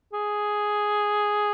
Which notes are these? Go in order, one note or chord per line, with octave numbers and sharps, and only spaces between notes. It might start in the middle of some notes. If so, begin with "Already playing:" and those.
G#4